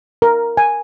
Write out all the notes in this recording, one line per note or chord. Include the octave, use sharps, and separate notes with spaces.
A#4
G#5